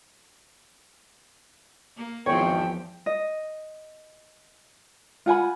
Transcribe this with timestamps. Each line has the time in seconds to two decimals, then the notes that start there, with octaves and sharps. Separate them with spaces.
1.97 A#3
2.26 G#1 E2 F3 C4 C#5 G5
3.06 D#5
5.26 F4 F#5 G#5 B5